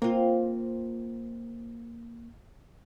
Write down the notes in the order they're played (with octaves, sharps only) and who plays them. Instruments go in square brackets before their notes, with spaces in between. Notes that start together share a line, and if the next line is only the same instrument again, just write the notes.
[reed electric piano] A#3 [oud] C4 F4